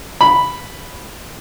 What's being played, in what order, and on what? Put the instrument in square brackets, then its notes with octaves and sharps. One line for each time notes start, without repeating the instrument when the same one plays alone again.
[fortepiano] B5